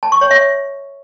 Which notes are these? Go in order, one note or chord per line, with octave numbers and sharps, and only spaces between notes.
A5
C#6
C#5
E5